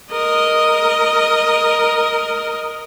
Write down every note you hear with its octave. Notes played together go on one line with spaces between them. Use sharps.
A#4 D#5